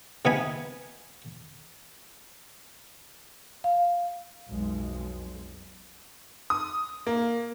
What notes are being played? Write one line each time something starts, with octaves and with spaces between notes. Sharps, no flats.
C3 B3 D#4 G#5 B5
F5
B1 F2 G#3
D#6
A#3